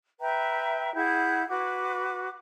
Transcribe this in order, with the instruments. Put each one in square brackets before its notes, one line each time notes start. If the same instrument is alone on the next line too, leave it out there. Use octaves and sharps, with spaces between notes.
[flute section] B4 E5 G5 A#5
E4 G#4 F#5 G6
F#4 B4 D6